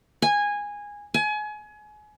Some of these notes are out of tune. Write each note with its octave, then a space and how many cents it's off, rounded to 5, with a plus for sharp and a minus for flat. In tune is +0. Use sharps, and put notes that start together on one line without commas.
G#5 -15
G#5 +30